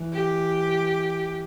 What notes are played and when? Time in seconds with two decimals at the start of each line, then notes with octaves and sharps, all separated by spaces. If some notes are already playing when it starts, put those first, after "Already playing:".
Already playing: E3
0.13 G4